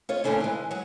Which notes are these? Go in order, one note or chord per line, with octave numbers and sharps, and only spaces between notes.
F4 C#5 D#5
A#2 C#3 A3 C#4 D4 E4
E3 G#3
F#3 G#4